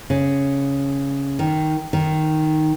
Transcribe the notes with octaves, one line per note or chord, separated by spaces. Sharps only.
C#3
D#3
D#3